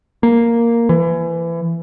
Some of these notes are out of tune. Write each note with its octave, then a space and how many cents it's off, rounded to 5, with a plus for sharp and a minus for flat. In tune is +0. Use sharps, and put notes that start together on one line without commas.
A#3 +0
E3 +25